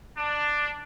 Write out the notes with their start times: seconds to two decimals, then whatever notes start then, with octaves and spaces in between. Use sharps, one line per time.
0.18 D4